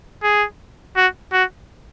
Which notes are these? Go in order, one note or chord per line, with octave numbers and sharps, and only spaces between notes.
G#4
F#4
F#4